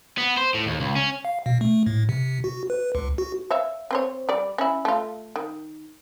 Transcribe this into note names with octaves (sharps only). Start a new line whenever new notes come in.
B3
C5
A2
D#2
C#2
C#4
F5
B2
A3
A2
C3
F#4
B4
C#2
F#4
C#5 E5 F5
C4 C5 C#5
G3 D5
C#4 E4
A3 F4
D#3